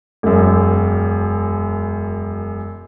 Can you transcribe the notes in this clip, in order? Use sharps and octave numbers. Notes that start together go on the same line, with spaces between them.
E1 F#2